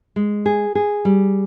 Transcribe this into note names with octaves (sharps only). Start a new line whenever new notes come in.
G#3
G#4
G#4
G3